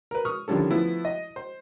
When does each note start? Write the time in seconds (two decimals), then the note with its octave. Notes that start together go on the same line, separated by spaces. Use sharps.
0.11 A#4 B4
0.25 C#6 D#6 F6
0.48 D3 D#3 F3 G3 C#4 A4
0.71 F3 A3 B3 E4
1.05 D#5
1.36 C5